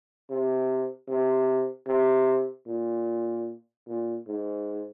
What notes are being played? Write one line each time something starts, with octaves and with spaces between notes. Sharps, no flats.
C3
C3
C3
A#2
A#2
G#2